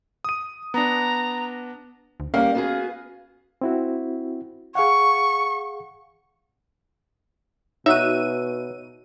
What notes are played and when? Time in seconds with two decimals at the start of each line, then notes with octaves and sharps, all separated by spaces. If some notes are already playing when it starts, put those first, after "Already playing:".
0.24 D#6 D#7
0.74 B3 D4 A#5
2.20 D2
2.34 G3 A#3 C#4 A#4 F5
2.55 B3 F#4 G#4
3.61 C4 E4 F#4
4.75 G#4 F5 F#5 C#6
7.86 B2 D#4 F#4 C#5 E5 E6 F#6 D#7